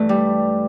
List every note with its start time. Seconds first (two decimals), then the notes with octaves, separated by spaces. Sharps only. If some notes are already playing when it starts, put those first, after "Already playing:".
Already playing: G2 E3 A3
0.09 G3